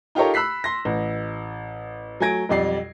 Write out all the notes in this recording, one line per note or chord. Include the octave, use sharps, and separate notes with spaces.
D#4 F4 G4 A4 A#4 C#5
B5 E6 F#6 B6 C7
C6 A#6
A1
F#3 A3 G#5 G#6 A#6 D7
B1 F2 G3 D5 C7